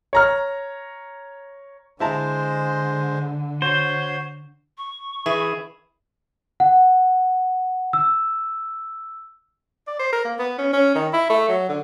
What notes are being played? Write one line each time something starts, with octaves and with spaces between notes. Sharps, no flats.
C#5 A#5 F6
D3 G#3 E4 C5 A5 A#5
F#4 C5 C#5
C#6
E3 E4 G#4
F#5
E6
D5
C5
A#4
A#3
B3
C#4
C#4
D#3
E4
A3
F#3
D3